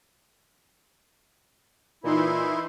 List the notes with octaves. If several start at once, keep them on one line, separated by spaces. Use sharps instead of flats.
A#2 E3 D#4 E4 C6